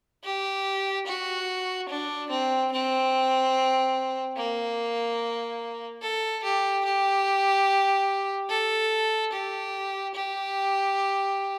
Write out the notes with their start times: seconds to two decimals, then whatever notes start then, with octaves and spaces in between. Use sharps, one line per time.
0.24 G4
1.07 F#4
1.89 D4
2.30 C4
2.72 C4
4.37 A#3
6.02 A4
6.44 G4
6.85 G4
8.50 A4
9.33 G4
10.15 G4